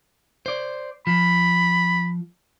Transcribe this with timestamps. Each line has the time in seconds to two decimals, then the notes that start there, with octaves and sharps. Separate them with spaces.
0.46 C5 D5
1.07 F3 B5